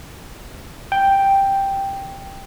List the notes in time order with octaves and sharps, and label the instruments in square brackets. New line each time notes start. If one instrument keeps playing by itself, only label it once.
[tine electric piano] G5